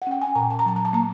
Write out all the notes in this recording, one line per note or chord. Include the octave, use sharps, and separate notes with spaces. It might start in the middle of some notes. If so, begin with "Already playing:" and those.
F#5
C#4 G5
G#5
A#2 A#5
A5
A#5
F#3 A5
A#5
A5
A#3 A#5